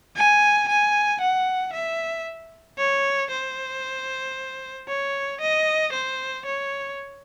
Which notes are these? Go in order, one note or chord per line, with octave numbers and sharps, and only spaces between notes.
G#5
G#5
F#5
E5
C#5
C5
C#5
D#5
C5
C#5